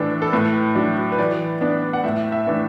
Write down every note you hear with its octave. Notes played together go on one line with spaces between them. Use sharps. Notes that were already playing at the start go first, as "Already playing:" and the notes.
Already playing: A2 E3 D4 A4
A4
A2 B4
F#3 D4
B4
E3 D5
B3 D4
F#5
A2 E5
E5
E3 A3 D4